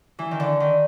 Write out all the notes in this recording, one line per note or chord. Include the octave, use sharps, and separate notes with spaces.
E3
D#3
D3
D#3